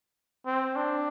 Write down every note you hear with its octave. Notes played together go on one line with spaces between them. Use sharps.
C4
D4